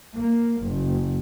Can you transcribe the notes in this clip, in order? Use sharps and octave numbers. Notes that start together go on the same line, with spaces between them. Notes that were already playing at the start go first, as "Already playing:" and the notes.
A#3
F#1